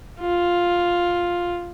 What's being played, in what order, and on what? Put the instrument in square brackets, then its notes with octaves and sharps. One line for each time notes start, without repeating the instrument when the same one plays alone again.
[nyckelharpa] F4